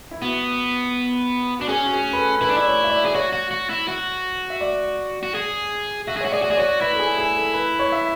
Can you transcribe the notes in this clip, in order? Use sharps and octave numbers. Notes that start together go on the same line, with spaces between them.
E4
B3 F#4
D4 F#4
C#4 G#4
F#4
G#4
B4
A4
E4 B4
D4
E4 D5
C#5
E5
D5
G#4
F#4 C#5
F#4
F#4
E4
F#4
E5
D5
F#4
G#4
F#4 E5
G#4
F#4 C#5
G#4 D5
F#4
G#4 D5
F#4 C#5
E4 B4
A4
G#4
G#4
A4
B4
C#5
E5